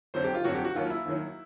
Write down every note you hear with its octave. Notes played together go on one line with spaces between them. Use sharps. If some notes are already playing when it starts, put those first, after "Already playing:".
F2 D3 F#3 C5
G4
F4
F2 D3 F#3 F#4
G4
F#4
D#2 D#3 F#3 F4
E4
D#2 D#3 F#3